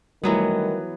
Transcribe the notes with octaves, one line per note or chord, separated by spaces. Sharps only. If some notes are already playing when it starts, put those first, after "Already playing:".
D#3 E3 F#3 G3 A3 B3